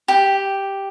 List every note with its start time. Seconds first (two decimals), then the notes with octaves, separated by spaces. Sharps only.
0.08 G4